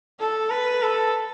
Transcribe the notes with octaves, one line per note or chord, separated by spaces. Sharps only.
A4
B4
A4